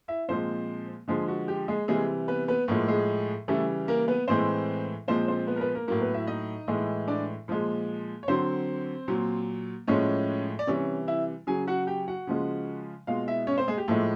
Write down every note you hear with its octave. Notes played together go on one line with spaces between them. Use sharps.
E4 E5
A#2 F3 G#3 C4 C5
D3 F3 G#3 G#4
F#4
G4
G#3 G#4
C3 E3 G3 G#3 G#4
B3 B4
B3 B4
A2 F3 G#3 A#3 A#4
G#3 G#4
C#3 E3 G3 A3 A4
A#3 A#4
B3 B4
A2 E3 G#3 C4 C5
A#2 F3 G#3 C4 C5
C4 C5
B3 B4
A#4
B3 B4
A#3 A#4
A2 F#3 A#3 A#4
B3 B4
E4 E5
D#4 D#5
A2 E3 G#3
D4 D5
A#2 F3 G#3
C#5
D3 F#3 C4 C5
A#2 F#3
A2 F3 G#3 C#4 C#5
D5
C3 E3 G3 C#4 C#5
E4 E5
C#3 F#3 G#4 G#5
F#4 F#5
G4 G5
F#4 F#5
C#3 F3 G#3
B2 G#3 F4 F5
E4 E5
C#4 C#5
C4 C5
G#3 G#4
G4
A2 F3 G#3 A3 A4